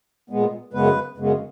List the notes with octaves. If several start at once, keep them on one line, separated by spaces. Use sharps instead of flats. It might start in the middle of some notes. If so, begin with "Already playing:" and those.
A#2 G#3 B3
F#2 C#3 G#3 B3 B4
F#2 C#3 G#3 B3